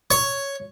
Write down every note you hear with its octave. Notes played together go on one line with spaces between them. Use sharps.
C#5